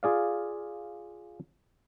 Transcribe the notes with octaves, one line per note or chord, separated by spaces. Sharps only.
F4 G#4 D5 F5